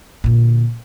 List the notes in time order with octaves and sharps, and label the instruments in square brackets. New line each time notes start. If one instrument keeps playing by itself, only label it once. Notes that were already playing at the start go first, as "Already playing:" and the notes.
[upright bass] A#2 D3